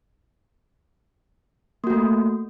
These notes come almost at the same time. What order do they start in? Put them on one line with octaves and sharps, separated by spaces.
A#3 F#4 A3